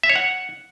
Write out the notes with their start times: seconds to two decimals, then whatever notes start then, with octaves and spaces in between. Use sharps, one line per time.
0.03 E5
0.10 C#5
0.16 F#5